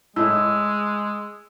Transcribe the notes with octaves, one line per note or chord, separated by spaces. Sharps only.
A2 G#3 D#4 E6